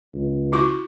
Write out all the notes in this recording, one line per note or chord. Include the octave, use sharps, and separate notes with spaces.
C#2
E4 F#4 C#6